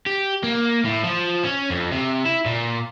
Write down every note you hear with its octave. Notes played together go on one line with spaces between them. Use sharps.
G4
A#3
A2
F3
C#4
F2
C3
E4
A#2